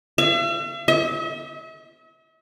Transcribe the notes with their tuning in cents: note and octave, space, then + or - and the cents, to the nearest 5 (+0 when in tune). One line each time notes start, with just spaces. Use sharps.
E5 +45
E5 -45